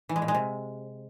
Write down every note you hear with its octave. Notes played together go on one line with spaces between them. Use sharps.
E3
G#3
A#2
G#3
C3